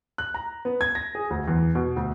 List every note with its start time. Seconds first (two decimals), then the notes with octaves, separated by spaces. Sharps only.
0.18 F#6
0.34 A#5
0.65 B3
0.81 G#6
0.95 A#6
1.15 G#4
1.30 D2
1.48 E2
1.75 B2
1.96 D2